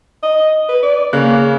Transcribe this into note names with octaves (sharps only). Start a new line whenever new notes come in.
D#5
B4
D5
C#3 A#3 F#6